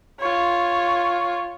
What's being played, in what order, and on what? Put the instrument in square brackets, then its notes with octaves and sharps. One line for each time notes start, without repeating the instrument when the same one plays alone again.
[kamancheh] F4 C#5